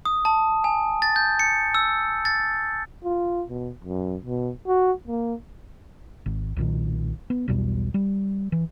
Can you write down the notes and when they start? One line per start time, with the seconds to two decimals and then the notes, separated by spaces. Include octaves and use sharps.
0.05 D#6
0.25 A5
0.64 G#5
1.02 A6
1.16 G6
1.39 C#7
1.75 E6
2.25 A6
3.04 F4
3.49 B2
3.84 F#2
4.25 B2
4.67 F#4
5.08 A#3
6.26 G#1
6.57 B1 A#2 D#3
7.30 B3
7.48 B1 E2 B2 G3
7.94 G3
8.52 E3